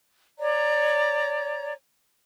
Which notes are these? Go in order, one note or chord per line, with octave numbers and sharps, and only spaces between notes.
C#5 D5 A#5